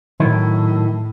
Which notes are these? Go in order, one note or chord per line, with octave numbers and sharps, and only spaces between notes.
A2 D#3 F#3 E4